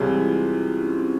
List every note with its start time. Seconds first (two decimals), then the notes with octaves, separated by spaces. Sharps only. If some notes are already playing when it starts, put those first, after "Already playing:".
Already playing: C2 C3 E3 G#3 C4 C#4
0.09 E4
0.20 F4
0.27 E4
0.47 F4
0.65 E4
0.77 C#4
0.88 C4
0.99 C#4